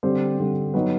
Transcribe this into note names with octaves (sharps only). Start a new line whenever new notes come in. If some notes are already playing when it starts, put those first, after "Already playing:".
D3 G3 C4 C5
D3 G3 C4
F#3 B3 D#4 B4